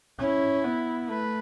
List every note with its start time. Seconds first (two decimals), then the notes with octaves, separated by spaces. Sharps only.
0.19 C#4 E4
0.64 B3
1.09 A3 B4